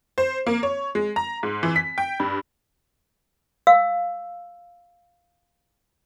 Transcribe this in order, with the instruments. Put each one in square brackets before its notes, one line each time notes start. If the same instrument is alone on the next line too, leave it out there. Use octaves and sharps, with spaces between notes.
[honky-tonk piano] C5
A#3
C#5
G#3
A#5
G#2
E3
B6
G5
G2
[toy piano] F5 E6